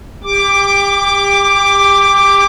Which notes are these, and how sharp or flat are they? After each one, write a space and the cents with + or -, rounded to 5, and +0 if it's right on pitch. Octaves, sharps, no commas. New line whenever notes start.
G4 +30 D6 +0